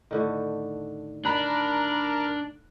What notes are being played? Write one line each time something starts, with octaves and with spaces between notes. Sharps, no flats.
A2 D3 D#3
D4 A#4 A#5 B5 F#6